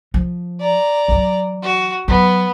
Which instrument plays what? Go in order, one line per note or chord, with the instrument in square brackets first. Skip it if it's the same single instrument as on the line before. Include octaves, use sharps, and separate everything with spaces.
[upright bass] F3
[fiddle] D5 A#5
[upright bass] E3 F#3
[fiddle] F#4
[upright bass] F#3 [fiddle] B3